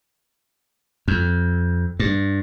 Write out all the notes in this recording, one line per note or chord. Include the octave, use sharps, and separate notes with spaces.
F2
G2